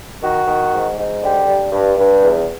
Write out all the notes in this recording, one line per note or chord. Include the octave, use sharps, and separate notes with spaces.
D#3 F#4
D#3
G#2
G#2
D3 G4
G2
G2
G2
E2